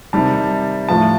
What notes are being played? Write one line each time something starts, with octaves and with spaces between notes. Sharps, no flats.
C3 D#3 G3 A5
A2 F3 A5